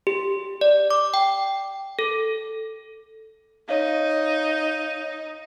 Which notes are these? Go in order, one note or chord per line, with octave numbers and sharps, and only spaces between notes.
G4
D5
D6
G5
A4
D#4 C#5 F5